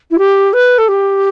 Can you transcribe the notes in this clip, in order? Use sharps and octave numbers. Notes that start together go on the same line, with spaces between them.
E4
G4
B4
A4
G4